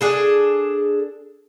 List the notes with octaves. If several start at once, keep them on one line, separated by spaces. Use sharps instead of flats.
D4 G#4 A4